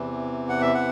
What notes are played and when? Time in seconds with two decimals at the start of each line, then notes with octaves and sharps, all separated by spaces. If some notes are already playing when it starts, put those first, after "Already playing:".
Already playing: E2 C3 E3
0.49 F#5
0.61 E5
0.74 F#5